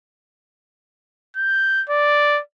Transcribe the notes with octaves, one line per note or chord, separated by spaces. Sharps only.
G6
D5